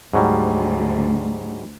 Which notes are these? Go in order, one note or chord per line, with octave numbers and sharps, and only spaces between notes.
D2 G#2 F#3 G3